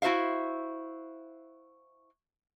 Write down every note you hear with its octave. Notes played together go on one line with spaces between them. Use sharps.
E4 F#4 C5 E5 F5